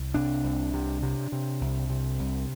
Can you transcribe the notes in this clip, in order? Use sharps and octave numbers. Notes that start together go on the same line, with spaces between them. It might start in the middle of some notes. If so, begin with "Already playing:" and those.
Already playing: C2
C3 D4
C2
C3
C3
C3
C2
C3
C2